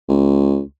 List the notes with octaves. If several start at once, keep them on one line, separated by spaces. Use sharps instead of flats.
C#2